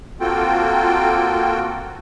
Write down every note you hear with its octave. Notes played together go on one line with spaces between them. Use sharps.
A#3 C4 F4 F#4 A4 G5